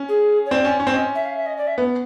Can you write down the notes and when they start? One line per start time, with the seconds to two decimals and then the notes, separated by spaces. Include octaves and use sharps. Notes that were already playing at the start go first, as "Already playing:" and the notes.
Already playing: C#4
0.08 G#4
0.46 C#5
0.50 C4 D5
0.65 C#4
0.80 C#4
0.87 C4
0.93 C#4 D#5
1.15 E5
1.25 F5
1.35 E5
1.46 D#5
1.57 D5
1.67 E5
1.78 B3